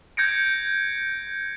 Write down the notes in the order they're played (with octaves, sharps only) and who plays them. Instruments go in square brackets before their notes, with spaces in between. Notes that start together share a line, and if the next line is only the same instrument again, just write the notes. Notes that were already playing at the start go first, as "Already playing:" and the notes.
[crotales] G6 G#6 A#6 C#7 D7